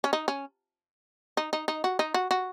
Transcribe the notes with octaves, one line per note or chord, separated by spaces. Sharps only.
C#4
D#4
C#4
D#4
D#4
D#4
F#4
D#4
F#4
F#4